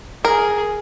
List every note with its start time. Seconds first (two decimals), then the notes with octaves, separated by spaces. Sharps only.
0.25 G#4 A#4